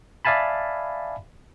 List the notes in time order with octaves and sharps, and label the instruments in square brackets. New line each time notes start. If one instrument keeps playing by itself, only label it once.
[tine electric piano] D5 E5 F5 G#5 A5 B5